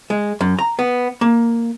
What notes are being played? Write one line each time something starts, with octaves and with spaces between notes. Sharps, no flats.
G#3
F#2
A#5
B3
A#3